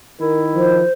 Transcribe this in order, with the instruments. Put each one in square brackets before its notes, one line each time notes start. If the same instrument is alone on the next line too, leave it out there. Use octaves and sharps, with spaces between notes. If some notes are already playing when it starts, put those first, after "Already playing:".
[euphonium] D#3 [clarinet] E4 [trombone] A#4
[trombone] F3 [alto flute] C5